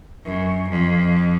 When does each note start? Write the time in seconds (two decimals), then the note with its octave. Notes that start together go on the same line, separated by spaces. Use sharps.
0.25 F#2
0.69 F2